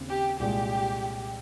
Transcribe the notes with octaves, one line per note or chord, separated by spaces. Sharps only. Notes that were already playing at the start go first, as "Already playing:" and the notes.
Already playing: D#2 C#3 C4
G4
C2 A#2 G#3 G4